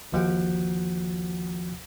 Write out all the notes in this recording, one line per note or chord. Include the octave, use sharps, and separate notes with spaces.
G1 D#2 F3 F#4 F#5 G5